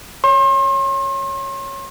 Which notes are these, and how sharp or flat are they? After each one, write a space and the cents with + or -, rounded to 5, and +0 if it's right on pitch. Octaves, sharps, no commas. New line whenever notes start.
C#5 +0 C6 +40